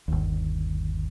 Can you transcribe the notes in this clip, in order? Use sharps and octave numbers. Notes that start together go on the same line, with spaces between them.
G1 D#2